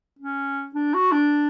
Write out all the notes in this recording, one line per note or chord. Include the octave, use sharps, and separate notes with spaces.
C#4
D4
F#4
D4